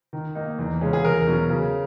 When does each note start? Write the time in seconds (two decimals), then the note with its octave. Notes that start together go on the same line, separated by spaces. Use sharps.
0.13 D#3
0.35 A#3 D#4
0.59 E2
0.81 C#3 G#3 C#4
0.93 G#4
1.05 E2 A#4
1.27 B2 F#3 C#4
1.50 C#3